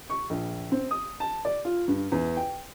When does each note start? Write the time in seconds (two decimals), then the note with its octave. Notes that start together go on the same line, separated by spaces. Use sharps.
0.10 C#6
0.30 A#1
0.72 C4
0.91 D#6
1.20 A5
1.45 D5
1.65 F4
1.88 G2
2.12 E2
2.37 G5